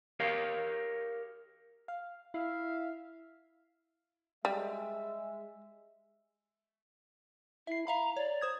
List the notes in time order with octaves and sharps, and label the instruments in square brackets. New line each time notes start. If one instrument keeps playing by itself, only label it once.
[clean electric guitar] G4 A#4 C#5 F5
[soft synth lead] F5
[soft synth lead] E4 [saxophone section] E5 F5
[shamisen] G3 [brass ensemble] G#3 E5
[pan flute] E4 [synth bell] E5 C7
[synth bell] E5 F5 B5 [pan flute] A#5
[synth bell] C#5 [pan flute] D5
[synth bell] C5 D#6 G#6